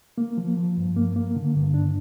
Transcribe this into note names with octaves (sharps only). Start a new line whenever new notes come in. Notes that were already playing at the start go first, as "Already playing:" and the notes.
A#3
F3
F3
G2
A#3
A#3
D3
G2
D4